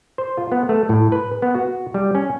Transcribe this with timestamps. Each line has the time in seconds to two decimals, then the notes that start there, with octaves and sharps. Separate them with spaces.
0.18 C5
0.37 F4
0.52 B3
0.69 A3
0.89 A2
1.12 B4
1.42 B3
1.55 F#4
1.94 G3
2.15 C#4